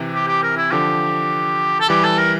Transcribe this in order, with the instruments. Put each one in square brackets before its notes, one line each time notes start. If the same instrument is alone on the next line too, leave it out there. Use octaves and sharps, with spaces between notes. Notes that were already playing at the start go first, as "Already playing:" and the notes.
Already playing: [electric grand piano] C3 E3
[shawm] G4
G4
A#4
E4
[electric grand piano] D3 F3 [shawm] G4
[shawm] A4
[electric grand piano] E3 G3 [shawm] G4
[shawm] A4
A#4